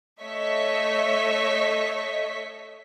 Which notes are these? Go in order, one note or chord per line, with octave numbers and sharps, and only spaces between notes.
A3 C#5 D#5 E5 C#6 B6